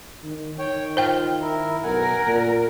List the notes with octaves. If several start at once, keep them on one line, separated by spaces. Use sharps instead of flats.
D#3
D#3 C#5 G5
F4 C5 G5
E4 A#4
B1 A#4 F#5 G#5
A#2